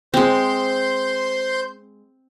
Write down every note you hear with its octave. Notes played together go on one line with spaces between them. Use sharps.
G#3 C4 C5 C6 G6